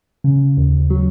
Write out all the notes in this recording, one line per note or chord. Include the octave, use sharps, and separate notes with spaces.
C#3
D#2
F#3